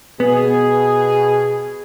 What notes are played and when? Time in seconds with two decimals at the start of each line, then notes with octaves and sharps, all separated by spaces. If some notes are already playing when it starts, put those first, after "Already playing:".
0.20 B2 B3 G#4